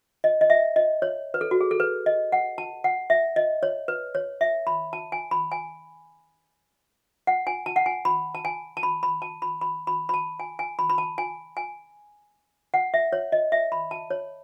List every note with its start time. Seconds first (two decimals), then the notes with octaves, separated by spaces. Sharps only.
0.24 D#5
0.41 D#5
0.50 E5
0.76 D#5
1.02 C#5
1.34 B4
1.41 A4
1.51 F#4
1.61 G#4
1.71 A4
1.80 B4
2.06 D#5
2.32 F#5
2.58 A5
2.84 F#5
3.10 E5
3.36 D#5
3.63 C#5
3.88 B4
4.15 C#5
4.41 E5
4.67 B5
4.93 A5
5.12 G#5
5.31 B5
5.52 G#5
7.27 F#5
7.47 G#5
7.66 A5
7.76 F#5
7.86 G#5
8.05 B5
8.35 A5
8.45 G#5
8.77 A5
8.83 B5
9.03 B5
9.22 A5
9.42 B5
9.61 B5
9.87 B5
10.09 B5
10.14 A5
10.40 G#5
10.59 G#5
10.79 B5
10.90 B5
10.98 A5
11.18 G#5
11.57 G#5
12.74 F#5
12.94 E5
13.13 C#5
13.32 D#5
13.52 E5
13.72 B5
13.91 A5
14.11 C#5